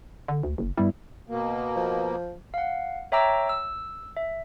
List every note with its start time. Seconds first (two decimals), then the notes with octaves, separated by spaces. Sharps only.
0.28 D3
0.43 D2
0.58 F#1
0.78 G2 G3 B3 E4
1.29 B2 A#3
1.76 F3
2.54 F5 F#5
3.12 C#5 E5 G5 A#5 D6 E6
3.49 E6
4.17 E5